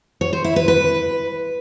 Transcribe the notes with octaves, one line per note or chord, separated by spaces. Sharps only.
C#5
C5
E4
B4
B4